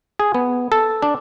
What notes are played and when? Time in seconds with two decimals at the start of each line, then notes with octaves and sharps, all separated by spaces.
0.19 G#4
0.34 B3
0.72 A4
1.02 D4